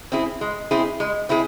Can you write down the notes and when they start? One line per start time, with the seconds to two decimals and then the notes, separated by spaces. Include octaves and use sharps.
0.12 C4 E4 G#4
0.41 G#3
0.71 C4 E4 G#4
1.00 G#3
1.29 C4 E4 G#4